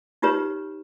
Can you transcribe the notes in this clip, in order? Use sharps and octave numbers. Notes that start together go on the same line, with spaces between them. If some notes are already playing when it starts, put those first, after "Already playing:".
D#4 F4 G4 B4 C#5